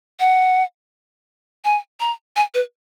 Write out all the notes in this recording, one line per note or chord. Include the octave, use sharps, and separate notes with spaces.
F#5
G#5
A#5
G#5
B4